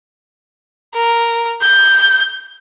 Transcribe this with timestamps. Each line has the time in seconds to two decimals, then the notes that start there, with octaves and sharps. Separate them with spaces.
0.95 A#4
1.61 G6